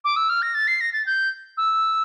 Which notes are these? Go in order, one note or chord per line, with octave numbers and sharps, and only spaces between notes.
D6
E6
F6
A#6
A6
C7
A#6
A6
G6
E6